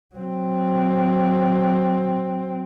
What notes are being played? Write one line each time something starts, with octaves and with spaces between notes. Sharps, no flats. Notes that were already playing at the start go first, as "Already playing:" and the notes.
F#3 C4